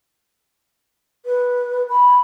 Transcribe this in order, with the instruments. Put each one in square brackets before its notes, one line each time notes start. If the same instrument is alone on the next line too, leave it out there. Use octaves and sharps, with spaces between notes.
[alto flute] B4
B5